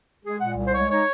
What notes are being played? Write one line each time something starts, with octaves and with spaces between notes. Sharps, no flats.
G#3 G#4
A#2 F#5
C2
C5
G#3 C#5
D#4 C#5